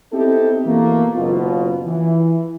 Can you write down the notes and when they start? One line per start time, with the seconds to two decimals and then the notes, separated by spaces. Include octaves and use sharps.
0.13 B3 C4 D#4 E4 G4 A4
0.65 B2 E3 A3 A#3
1.15 F#1 B2 F4
1.85 E3